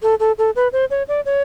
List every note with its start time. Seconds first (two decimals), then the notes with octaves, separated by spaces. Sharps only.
0.03 A4
0.20 A4
0.38 A4
0.56 B4
0.73 C5
0.91 C#5
1.08 D5
1.25 C#5